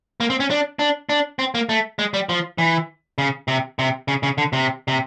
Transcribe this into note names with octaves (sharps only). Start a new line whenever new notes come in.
A#3
C4
C#4
D4
D4
D4
C4
A#3
A3
G#3
G3
F3
E3
C#3
C3
C3
C#3
C#3
D3
C3
C3